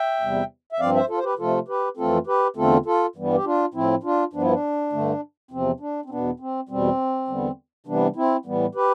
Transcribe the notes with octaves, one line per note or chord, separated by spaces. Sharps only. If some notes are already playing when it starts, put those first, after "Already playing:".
Already playing: E5 G5
E2 C3 G3
E5
G2 F3 C4 D5 F5
C5 E5
F4 A4
C5
G4 B4
C3 F3 A3 F4 A4
G4 B4
F2 E3 A3 C4 F4 A4
G4 B4
E2 D3 A3 C4 F4 A4
F4 A4
G2 E3 G3 B3
G4
D4 F4
A2 F3 C4 E4
D4 F4
G2 F3 B3 D4
E4
D4
G2 D3 A3
E2 C3 F3 C4
D4
C4
E2 B2 B3 D4
C4
E2 B2 G3 C4
E2 D3 G3 B3
C3 E3 G3 B3 D4
C4 E4
A2 E3 G3 B3
G4 B4